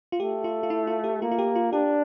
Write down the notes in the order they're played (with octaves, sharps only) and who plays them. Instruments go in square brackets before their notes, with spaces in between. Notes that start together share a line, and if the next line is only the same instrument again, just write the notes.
[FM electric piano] F4
[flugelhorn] A3 [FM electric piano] G4
[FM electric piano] F4
F4
E4
F4
G4
[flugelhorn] A#3 [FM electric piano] F4
[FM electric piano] F4
G4
F4
[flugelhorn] D4 [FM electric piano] G4